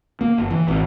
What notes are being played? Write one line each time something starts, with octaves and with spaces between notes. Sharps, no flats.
A#3
G1
E3
G#1